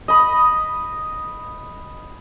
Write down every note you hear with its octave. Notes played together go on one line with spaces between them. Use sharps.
D#5 B5